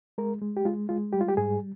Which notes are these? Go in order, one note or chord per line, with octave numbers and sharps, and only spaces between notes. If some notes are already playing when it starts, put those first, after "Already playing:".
G#3 A#4
G#3
G4
G#3 F4
G#3 F4
G3 G4
F4
G4
G#2 G#4